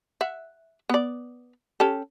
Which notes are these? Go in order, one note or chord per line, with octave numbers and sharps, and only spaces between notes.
E5 F#5
B3 D5
C#4 G4 A4